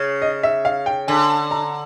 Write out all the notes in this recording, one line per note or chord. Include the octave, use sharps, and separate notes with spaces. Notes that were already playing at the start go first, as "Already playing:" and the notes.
Already playing: C#3
D#5
E5
F5
G5
D3 G#5
A#5